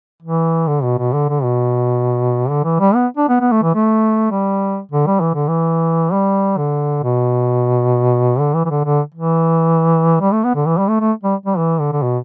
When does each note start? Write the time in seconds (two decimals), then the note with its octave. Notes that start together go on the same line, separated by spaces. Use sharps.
0.22 E3
0.68 D3
0.83 B2
0.98 B2
1.13 D3
1.29 D3
1.43 B2
2.50 D3
2.64 E3
2.80 G3
2.95 B3
3.17 D4
3.29 B3
3.40 B3
3.52 A3
3.63 E3
3.75 A3
4.31 G3
4.91 D3
5.06 G3
5.20 E3
5.34 D3
5.48 E3
6.12 G3
6.57 D3
7.03 B2
8.39 D3
8.55 E3
8.65 E3
8.70 D3
8.85 D3
9.15 E3
10.20 G3
10.32 A3
10.44 B3
10.55 D3
10.67 E3
10.78 G3
10.89 A3
11.00 A3
11.23 G3
11.46 G3
11.58 E3
11.80 D3
11.93 D3
12.02 B2